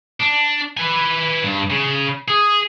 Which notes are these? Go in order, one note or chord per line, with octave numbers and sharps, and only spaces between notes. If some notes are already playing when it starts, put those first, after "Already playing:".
D4
B4 G#5
G2
C#3
G#4